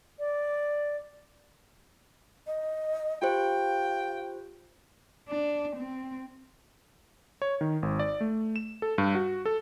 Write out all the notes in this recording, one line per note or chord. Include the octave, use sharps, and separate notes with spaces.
D5
D#5
F4 G4 C5 F5 G5
D4
C4
C#5
D#3
G#1
D5
A3
E7
A4
G2
F#4
A4